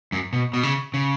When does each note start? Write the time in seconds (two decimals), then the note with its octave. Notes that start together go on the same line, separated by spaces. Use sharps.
0.12 F#2
0.33 B2
0.54 B2
0.63 C#3
0.94 C#3